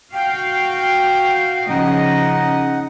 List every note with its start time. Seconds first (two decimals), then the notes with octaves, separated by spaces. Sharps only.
0.13 F#4 F5 G5
1.70 C#3 F3 D#4 D#5 F#5